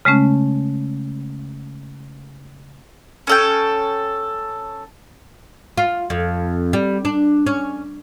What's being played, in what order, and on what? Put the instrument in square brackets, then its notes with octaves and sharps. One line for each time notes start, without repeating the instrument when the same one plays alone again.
[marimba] C#3 G#3 A3 C#4
[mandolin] C#4 A4 G5
[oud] F4
F2
G3
D4
C#4